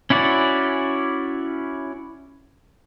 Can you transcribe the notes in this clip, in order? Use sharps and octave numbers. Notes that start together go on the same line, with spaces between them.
C#4 E4 F#4 D5